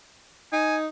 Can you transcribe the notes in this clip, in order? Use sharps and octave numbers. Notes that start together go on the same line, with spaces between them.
D#4 G#5